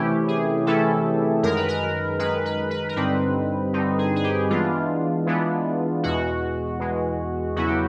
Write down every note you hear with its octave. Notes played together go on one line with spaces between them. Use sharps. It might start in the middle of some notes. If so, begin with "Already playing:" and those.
Already playing: C3 E3 A3 C#4 E4 G4
G#4
C3 E3 A3 C#4 E4 A4
F#2 D#3 G#3 A#4
B4
A#4
F#2 D#3 G#3 B4
B4
B4
A#4
G2 D3 G3 C4 D#4 B4
G2 D3 G3 C4 D#4
G#4
G#4
G4
E3 G#3 B3 D4 F4
E3 G#3 B3 D4
E2 B2 G#3 F#4
E2 B2 G#3
E2 C#3 F#3 B3 E4 F#4
G4